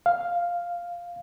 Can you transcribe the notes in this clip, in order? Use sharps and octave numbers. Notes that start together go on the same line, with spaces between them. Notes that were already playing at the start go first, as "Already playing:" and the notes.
F5